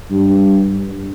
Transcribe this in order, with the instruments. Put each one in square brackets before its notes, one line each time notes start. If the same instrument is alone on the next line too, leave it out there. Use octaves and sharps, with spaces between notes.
[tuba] G2